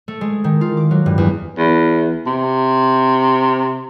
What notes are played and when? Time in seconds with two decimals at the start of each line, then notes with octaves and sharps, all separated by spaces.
0.08 A3
0.21 G#3
0.44 D#3
0.61 F4
0.77 D6
0.91 F#3
1.06 G2
1.18 E2
1.57 E2
2.26 C3